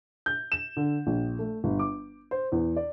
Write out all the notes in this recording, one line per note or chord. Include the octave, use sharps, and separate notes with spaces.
G6
E7
D3
A#1
A3
G1
D6
C5
E2
D5